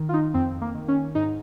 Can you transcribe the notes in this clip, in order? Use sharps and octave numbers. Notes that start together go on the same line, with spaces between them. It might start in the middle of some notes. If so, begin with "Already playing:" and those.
Already playing: D#3
F4
D#4
F2 C4
A#3
D#3
C#4
G#2 D#4